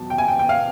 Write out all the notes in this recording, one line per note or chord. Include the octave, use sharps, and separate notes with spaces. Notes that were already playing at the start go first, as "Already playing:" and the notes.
Already playing: E2 B2 F#3 A5
G5
G#5
G5
G5
F5